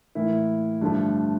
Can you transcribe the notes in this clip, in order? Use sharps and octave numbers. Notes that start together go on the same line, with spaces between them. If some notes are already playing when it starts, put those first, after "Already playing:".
A2 E3 A#3 E4
G2 D3 F3 A3